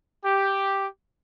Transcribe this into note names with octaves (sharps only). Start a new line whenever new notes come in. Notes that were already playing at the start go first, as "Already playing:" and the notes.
G4